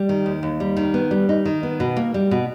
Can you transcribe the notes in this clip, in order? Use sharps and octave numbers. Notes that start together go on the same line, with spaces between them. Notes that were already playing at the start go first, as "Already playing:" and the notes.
Already playing: G3
D#3
D#2
D#2
G3
D#3
B3
G3
D#4
D#3
B3
B2
A#3
G3
B2